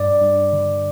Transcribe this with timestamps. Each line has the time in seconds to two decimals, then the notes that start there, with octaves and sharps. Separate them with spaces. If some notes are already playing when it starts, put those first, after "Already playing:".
Already playing: G2 D5
0.21 G2
0.53 D3